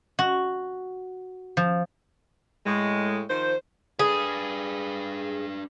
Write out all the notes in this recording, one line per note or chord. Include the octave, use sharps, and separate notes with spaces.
F#4
F3
A2 G#3
D#3 F3 C5
D4 G#4 B4